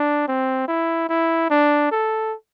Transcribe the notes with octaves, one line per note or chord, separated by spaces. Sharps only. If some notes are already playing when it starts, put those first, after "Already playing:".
Already playing: D4
C4
E4
E4
D4
A4